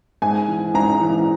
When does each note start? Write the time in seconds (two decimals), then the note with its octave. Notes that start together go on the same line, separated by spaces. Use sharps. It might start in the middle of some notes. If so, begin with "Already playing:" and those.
0.22 G#2 G#5
0.48 E3
0.74 G#2 A#5
1.00 E3